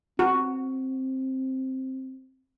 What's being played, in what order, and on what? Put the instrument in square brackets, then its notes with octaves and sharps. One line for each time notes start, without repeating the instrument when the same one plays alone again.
[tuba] C4 [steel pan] F#4